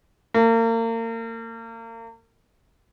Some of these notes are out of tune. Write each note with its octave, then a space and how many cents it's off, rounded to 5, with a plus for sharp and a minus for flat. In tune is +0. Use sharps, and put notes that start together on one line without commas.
A#3 -35